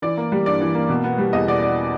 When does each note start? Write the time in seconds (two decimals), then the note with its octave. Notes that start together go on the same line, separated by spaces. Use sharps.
0.02 E3 D5
0.17 A#3
0.32 G3
0.46 G2 D5
0.61 E3
0.75 A#3
0.90 B2
1.04 B3
1.18 G3
1.33 E2 D#5
1.48 B2 D5
1.62 B3 D5